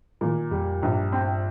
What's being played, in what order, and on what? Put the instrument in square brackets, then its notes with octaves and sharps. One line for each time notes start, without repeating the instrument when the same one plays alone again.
[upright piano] A#2 [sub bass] D#3
[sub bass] F2 [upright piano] G3
[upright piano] A#1 [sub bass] G2
[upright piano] C4